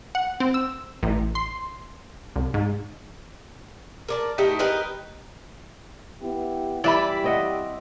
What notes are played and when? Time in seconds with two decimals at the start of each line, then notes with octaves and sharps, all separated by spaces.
0.15 F#5
0.40 C4
0.54 E6
1.03 A1
1.35 C6
2.36 C2
2.54 G#2
4.09 A#4 D5 A5
4.38 A3 D#4 E4 G4
4.59 G4 A#4 B4 D#5
6.21 B3 E4 G4
6.84 E3 G3 D5 E5 B5
7.24 C4 D#5 F#5